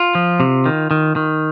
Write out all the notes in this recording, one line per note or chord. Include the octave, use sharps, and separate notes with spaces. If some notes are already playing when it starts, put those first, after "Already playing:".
Already playing: F4
F3
C3
D#3
D#3
D#3